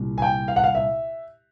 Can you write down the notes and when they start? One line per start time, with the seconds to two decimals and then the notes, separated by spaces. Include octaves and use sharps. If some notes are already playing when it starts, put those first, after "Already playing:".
Already playing: C2 A#2
0.18 G#5
0.22 G5
0.48 F5
0.56 F#5
0.64 F5
0.75 E5